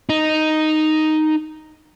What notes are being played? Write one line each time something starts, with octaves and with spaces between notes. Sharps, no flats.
D#4